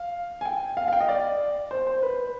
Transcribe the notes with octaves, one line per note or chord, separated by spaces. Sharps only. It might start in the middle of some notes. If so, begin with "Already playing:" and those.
Already playing: F5
G#5
G5
F5
F5
G5
D#5
D5
C5
C5
B4